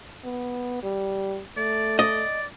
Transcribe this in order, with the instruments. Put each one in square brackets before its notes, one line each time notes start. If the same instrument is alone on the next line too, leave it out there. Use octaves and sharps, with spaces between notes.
[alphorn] B3
G3
[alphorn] A3 [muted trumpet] D5
[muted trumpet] D5 [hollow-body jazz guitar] D#5